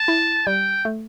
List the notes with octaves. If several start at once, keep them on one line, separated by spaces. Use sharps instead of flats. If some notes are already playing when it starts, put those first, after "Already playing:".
Already playing: A5
E4
G3 G5
A3